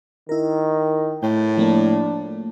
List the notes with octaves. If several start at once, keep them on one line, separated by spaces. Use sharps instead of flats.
D#3 E4 A#4
A2 G5
F3 A3 A#3 D4